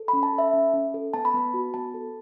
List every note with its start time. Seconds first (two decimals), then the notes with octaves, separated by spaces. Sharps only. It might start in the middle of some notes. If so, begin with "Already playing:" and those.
Already playing: A4
0.08 B5
0.13 C#4
0.23 A5
0.33 A4
0.38 E5
0.53 C#4
0.74 C#4
0.94 A4
1.14 B3 A5
1.25 B5
1.34 B3 A5
1.54 F#4
1.74 B3 A5
1.94 A4